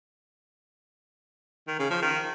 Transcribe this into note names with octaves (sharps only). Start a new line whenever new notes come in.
D#3
C#3
F3
D#3